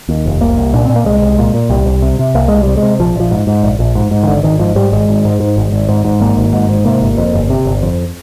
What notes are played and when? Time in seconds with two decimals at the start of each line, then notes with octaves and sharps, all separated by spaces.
0.09 D#2
0.26 F1
0.41 C2 A#3
0.58 C2
0.73 A#2 D4
0.85 A#2 C4
0.96 A#3
1.05 C2 G#3
1.22 C2
1.39 A#2
1.54 A#2
1.69 C2 G3
1.86 C2
2.02 C3
2.19 C3
2.34 C2 A#3
2.48 C2 G#3
2.63 C3 G3
2.77 G#3
2.83 C3
2.99 A#1 F3
3.16 A#1 F3
3.31 G#2
3.47 G#2
3.63 A#1
3.79 A#1
3.95 G#2
4.11 G#2
4.23 D#3
4.27 G#1 D3
4.43 G#1 D#3
4.59 G#2 F3
4.76 G#2 G3
4.92 G#1 G#3
5.09 G#1
5.25 G#2
5.40 G#2
5.57 G#1
5.72 G#1
5.89 G#2
6.05 G#2
6.20 G#1 A#3
6.37 G#1
6.53 G#2
6.69 G#2
6.85 C3 A#3
7.01 G1
7.17 F2
7.34 G1
7.50 C3
7.65 G1
7.82 F2